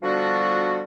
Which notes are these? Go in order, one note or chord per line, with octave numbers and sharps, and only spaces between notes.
D3 F3 G3 B3 D4 F#4